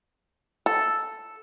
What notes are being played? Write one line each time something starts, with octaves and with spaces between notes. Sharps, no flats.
A4